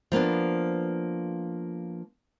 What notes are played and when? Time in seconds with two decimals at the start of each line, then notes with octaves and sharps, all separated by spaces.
0.12 F3 A#3 B3 D4